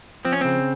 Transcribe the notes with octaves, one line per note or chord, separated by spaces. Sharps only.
F3 C4
C#4
C#3 C4